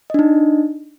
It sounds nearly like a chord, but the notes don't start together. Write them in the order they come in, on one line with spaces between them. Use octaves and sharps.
D#5 D4 D#4